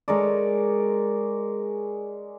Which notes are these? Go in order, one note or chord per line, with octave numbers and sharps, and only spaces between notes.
G#3 A#4 C#5 D5